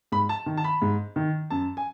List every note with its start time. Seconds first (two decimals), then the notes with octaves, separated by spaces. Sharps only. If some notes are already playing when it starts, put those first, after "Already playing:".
0.12 G#2 B5
0.29 A5
0.46 D#3
0.57 A5
0.64 B5
0.82 G#2
1.16 D#3
1.50 F#2 A5
1.77 G#5